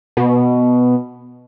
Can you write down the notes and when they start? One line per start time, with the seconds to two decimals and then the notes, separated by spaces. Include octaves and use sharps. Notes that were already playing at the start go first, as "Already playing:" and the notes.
0.17 B2